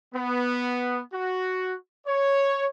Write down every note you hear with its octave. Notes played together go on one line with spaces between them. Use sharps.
B3
F#4
C#5